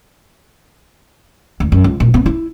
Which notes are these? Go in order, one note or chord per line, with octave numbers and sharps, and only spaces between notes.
D2
F#2
C#2
A#2
B3
E4